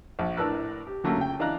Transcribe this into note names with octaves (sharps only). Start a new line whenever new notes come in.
A#1
A2 D4 A#4 B4 E6 F#6
G4
D3 F#3 A3 A#3 C#4
C#2 G5
E3 D4 D#5 F5 A#5 F#6